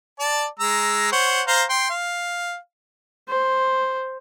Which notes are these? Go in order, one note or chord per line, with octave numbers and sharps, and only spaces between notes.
D5 A5
G#3 A#5 E6
C5 C#5 F#5
C5 F5 A#5
G5 C6
F5
C5